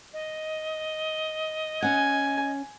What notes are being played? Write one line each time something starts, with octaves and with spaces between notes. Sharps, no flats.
D#5
C#4 F#5 G#5